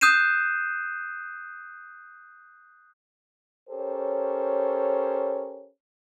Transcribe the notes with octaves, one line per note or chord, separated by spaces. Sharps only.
D#6 F#6 G6 C7 D#7 E7
C#4 G4 A4 A#4 C5 C#5